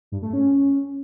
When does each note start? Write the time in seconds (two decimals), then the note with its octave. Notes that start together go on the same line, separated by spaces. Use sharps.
0.12 G2
0.23 A3
0.33 C#4